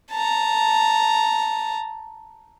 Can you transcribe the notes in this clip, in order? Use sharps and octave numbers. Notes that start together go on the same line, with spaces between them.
A5 A#5